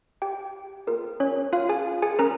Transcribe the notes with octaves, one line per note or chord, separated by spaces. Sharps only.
G4 G5
A#3 F4 G#4 A#4
C#4 C#5
F4 F5
G#4 G#5
G#4 G#5
C#4 G#4 A#4 A#5